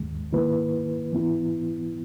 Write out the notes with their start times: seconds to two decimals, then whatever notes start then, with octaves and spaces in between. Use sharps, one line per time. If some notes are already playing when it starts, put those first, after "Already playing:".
Already playing: D#2 D#3 G#3
0.33 D#3 A#3 E4 B4
1.12 E3 B3 E4